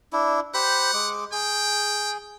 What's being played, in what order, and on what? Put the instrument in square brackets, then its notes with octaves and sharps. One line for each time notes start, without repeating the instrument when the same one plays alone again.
[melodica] D4 E4
[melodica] G4 C5 B5 [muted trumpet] F#5
[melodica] G#3 D6
[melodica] G#4 [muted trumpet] G5